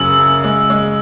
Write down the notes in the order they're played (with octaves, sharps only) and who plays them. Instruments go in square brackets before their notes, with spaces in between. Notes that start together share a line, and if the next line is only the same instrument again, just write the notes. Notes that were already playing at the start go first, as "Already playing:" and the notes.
Already playing: [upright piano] F#2 C#3 A#3 [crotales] E6
[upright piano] C#3
G#3
G#3